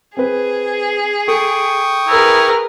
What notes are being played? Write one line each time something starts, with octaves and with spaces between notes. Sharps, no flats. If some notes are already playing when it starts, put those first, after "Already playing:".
C4 G#4 B4
A4 G5 C#6 D#6
E4 G#4 A#4 B4